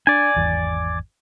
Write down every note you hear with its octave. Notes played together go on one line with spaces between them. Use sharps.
D4 D5 G#5
G#1 E2